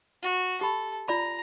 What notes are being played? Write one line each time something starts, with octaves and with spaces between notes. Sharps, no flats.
F#4
G4 A4 B5
F4 D5 A#5 B5